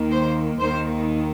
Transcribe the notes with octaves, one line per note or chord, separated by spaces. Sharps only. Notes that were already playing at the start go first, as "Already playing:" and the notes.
Already playing: D#2 D#3 A#3
C5
D#2 D#3 A#3 C5